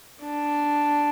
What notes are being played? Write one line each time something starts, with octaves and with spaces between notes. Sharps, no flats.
D4